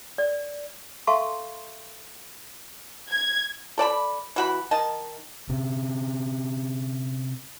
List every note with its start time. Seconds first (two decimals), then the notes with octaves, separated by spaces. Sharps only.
0.18 D5
1.07 A4 E5 F5 A5 C6 C#6
3.10 G#6
3.78 A4 D5 A5 B5
4.36 E3 F#4 B5
4.71 D#3 D#5 A5
5.49 C3 C4 C#4